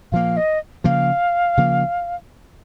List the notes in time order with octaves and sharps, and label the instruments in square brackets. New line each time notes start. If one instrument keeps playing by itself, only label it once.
[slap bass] A#2 F3 A#3 [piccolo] F5
[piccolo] D#5
[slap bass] C#3 F3 A#3 [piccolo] F5
[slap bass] C#3 F3 A#3